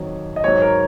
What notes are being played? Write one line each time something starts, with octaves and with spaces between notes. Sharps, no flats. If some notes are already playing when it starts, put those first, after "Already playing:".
Already playing: F2 D#3 F#3 C#5
D#5
G#2 F#3 C#5
A#4